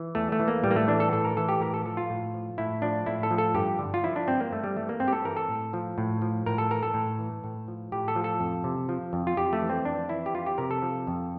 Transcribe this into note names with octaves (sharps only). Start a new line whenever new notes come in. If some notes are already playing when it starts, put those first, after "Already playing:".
Already playing: E3
E2 A3
A3
E3
A#3
A2 G3
A#3
A3
E3 D4
A4
A2 A4
A#4
E3 A4
G4
A2 A#4
A4
F3 A4
F4
A2
F3
A2 E4
F3 D4
A2 E4
A4
F3
A4
G2 G4
D3
F4
F3 E4
D4
G2 C4
A#3
G2 A3
G3
E3 A3
A#3
G2 C4
G4
A4
E3 A#4
A4
A2
F3
A2
F3
A2 A#4
A4
E3 A#4
A4
A2
E3
A2
F3
A2 G4
A4
F3
A4
F2
C3
F3
F2
F4
F2 G4
A3
E3
C4
F2 D4
E3 E4
G4
F2 F4
G4
C3 A#4
A4
F3
F2